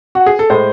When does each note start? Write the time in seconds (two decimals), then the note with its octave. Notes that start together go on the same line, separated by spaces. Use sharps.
0.15 F#4
0.26 G#4
0.39 A4
0.50 A2 G#3 C5